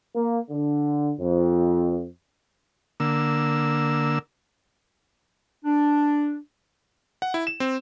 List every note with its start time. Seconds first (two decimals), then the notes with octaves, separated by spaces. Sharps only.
0.15 A#3
0.49 D3
1.19 F2
3.00 D3 A#3 E6
5.65 D4
7.22 F#5
7.34 E4
7.47 E7
7.60 C4